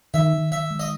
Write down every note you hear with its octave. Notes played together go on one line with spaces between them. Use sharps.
D#3 E5
D#3
D#3 E5
G#3
D#5